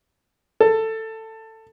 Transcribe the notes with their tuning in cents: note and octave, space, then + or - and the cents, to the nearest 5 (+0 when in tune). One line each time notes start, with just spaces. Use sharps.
A4 +15